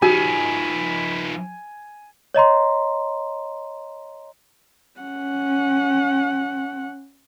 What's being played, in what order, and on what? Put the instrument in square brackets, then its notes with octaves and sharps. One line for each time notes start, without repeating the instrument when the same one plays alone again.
[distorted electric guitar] F3 D#4 [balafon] F#4 G4 [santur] G#5 [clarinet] B5
[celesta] C#5 D#5 A#5 C6
[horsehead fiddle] C#4 F#5